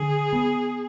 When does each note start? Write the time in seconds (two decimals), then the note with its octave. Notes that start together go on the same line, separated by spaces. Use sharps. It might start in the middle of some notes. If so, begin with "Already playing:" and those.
Already playing: D3 G#4
0.33 B3